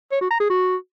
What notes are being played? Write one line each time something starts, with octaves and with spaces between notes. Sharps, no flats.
C#5
F#4
A#5
G#4
F#4